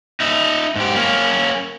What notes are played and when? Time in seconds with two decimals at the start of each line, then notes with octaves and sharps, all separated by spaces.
0.20 D#4 E5
0.76 G#2 G4
0.96 A#3 C#4